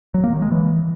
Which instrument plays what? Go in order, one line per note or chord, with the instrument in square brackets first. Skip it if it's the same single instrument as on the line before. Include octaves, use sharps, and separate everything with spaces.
[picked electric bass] F#3
A#3
D#3
G#3
E3